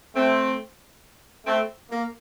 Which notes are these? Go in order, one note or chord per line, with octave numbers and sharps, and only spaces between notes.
A3 C4
A3 C4
A#3